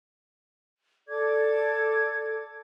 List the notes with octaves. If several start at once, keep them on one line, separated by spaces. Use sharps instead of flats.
A4 D5 D6 G#6